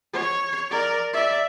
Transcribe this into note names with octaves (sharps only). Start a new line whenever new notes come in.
C#5
A#4 D5
D5 E5